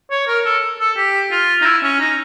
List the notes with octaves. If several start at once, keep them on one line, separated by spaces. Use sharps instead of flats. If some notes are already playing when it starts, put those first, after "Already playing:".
C#5
A#4
A4
A4
G4
F4
D#4
E4
C#4
D#4